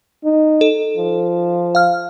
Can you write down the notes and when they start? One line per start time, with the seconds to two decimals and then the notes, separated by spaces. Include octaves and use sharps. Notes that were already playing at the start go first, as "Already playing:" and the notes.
0.24 D#4
0.61 A4
0.97 F3
1.75 F5 F6